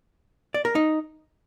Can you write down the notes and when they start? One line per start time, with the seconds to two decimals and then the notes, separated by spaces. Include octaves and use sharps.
0.54 D5
0.65 A#4
0.75 D#4